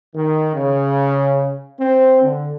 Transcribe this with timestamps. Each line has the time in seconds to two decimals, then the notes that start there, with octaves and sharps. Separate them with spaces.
0.15 D#3
0.54 C#3
1.78 C4
2.22 D3